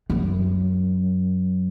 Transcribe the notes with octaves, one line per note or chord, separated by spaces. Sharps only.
F#2